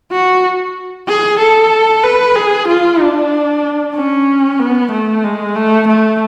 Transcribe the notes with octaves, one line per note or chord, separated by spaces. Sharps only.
F#4
G#4
A4
B4
G#4
F4
D4
C#4
B3
A3
G#3
A3
A3